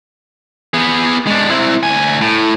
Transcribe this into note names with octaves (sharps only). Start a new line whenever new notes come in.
B3 G#4
G#3 D4
C4 E4
D2 G#5
A2